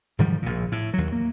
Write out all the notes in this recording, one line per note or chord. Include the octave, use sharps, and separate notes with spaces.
G#2 D#3 F3 G3
A#1 A#2
A2
D#2 F#3
A#3